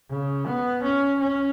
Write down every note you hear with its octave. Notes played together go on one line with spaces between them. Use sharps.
C#3
B3
C#4
C#4